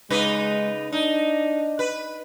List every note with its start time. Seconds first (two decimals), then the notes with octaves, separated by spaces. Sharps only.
0.10 C#3 G#3 D#4 B4
0.93 D4 D#4
1.79 B4